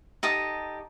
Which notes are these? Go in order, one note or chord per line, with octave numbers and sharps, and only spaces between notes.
D#4 G4 A4 D#6